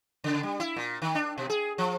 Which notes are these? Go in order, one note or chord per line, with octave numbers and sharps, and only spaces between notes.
C#3
G3
E4
A#2
D#3
D4
B2
G#4
F3